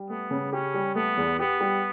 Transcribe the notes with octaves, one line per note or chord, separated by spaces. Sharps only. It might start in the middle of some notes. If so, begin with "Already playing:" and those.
Already playing: G3
A3 B3
C#3
C#4 G4
G3
A3 B3
E2
B3 G4
G3